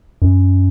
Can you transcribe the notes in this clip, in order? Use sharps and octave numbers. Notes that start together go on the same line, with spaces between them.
F#2